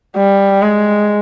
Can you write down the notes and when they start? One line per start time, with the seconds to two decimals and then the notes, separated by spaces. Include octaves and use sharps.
0.17 G3
0.63 G#3